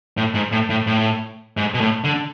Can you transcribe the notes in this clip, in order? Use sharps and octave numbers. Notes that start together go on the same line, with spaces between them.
A2
G#2
A2
A2
A2
G#2
B2
A2
D3